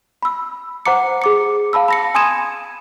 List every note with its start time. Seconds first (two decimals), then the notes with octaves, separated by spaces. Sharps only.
0.22 B5 E6
0.86 C5 F#5 A#5 D6 C#7
1.22 G#4 D6 C#7
1.73 F5 A5 B5 E6
1.88 B5 A#6 C#7
2.15 G#5 C6 D#6 G#6 D#7 E7